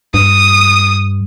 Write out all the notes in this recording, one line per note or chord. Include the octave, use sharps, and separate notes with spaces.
G2 D#6